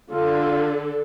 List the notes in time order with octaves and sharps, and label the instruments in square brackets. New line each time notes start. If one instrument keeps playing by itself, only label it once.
[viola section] D3 A4 [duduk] F4